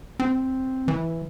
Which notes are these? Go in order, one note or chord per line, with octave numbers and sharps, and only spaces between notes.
C4
E3